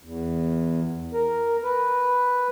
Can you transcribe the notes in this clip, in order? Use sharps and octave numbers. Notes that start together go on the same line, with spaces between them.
E2
A#4
B4